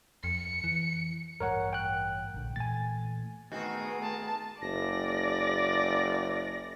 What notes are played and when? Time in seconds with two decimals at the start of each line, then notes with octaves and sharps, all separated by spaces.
0.24 F2 C#7
0.64 E3
1.40 A1 G2 A#4 C#5 F#5
1.73 G5 F#6
2.34 A#1 D3
2.56 A#2 E3 A3 G#5 A6
3.52 D#3 A3 B3 C4 F#4 G#4
4.02 A5
4.62 F#1 D5 A#6